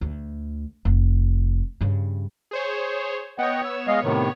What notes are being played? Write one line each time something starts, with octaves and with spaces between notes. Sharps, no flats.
D2
F1
G2 C#3
G#4 C5 C#5
B3 C#5 D#5 F#5 G5
E6
G#3 D#5 F5
A2 C3 D#3